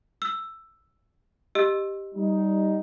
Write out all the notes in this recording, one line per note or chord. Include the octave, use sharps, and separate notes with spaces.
E6
G4 D#5 E6
G3 D#4